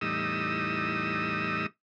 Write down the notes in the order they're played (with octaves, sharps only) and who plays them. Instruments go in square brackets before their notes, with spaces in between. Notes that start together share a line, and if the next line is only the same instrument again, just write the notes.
[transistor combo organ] E2 A2 G3 D#4 D#6 E6